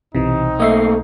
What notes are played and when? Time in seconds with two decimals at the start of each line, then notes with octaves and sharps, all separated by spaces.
0.15 B1 C3 E3 C4 D#4 E4
0.60 A3 A#3 D#5 E5 C7